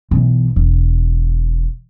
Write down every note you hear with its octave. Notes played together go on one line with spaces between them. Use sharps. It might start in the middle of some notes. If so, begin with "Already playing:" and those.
B1 E3
E1